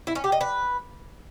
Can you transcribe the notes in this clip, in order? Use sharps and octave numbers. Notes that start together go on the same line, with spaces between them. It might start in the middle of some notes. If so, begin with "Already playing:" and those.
E4
C#4
G4
D#5
B4